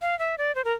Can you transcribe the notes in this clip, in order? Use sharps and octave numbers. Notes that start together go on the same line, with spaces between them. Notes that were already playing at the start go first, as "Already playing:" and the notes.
F5
E5
D5
C5
A#4